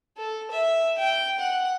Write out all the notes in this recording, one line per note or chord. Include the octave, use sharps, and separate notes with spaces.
A4
E5
G5
F#5